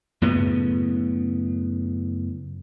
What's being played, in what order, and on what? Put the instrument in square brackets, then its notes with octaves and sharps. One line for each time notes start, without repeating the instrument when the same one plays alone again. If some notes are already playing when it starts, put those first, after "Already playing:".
[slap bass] F#2 A2 C#3 B3